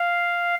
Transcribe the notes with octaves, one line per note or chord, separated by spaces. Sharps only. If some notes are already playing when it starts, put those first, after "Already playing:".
Already playing: F5